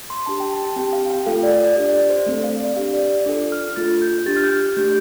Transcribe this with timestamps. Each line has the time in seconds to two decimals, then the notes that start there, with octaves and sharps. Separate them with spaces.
0.10 C6
0.26 D4 G4 A5
0.40 G5
0.53 A5
0.76 C4 G4 G5
0.93 F5
1.10 G5
1.26 A3 F4 A4 F5
1.43 D5
1.61 D5
1.76 D4 G4 D5
1.94 D5
2.10 C5
2.26 A3 C4 A4
2.44 F5
2.60 D5
2.77 D4 G4 F5
2.94 D5
3.10 D5
3.26 D4 F4 A4 D6
3.52 F6
3.76 A3 F4 A4 A6
4.02 G6
4.26 D4 G4 A6
4.37 F6
4.44 G6
4.60 G6
4.76 A3 D4 G4 G6